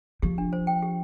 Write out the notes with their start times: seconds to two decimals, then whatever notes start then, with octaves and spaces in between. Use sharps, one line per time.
0.22 F3 G4
0.38 D4
0.53 C5
0.67 G5
0.83 G4